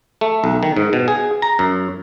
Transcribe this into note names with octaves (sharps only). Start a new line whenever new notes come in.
A3
B1
D#3
G#2
B2
G#4
A#5
F#2